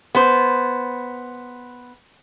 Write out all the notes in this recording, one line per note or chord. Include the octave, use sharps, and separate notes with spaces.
B3 C5